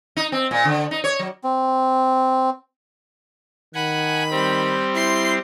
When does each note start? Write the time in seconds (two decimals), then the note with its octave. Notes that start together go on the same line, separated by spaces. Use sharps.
0.16 D#4
0.32 C4
0.51 A#2
0.65 D3
0.91 D#4
1.04 C#5
1.19 F#3
1.44 C4
3.75 D#3 F#5 G#5 B5
4.31 G3 C4
4.95 E4 C6 C7